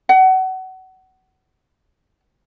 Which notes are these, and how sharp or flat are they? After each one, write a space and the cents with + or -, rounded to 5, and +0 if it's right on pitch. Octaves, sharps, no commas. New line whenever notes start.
F#5 +25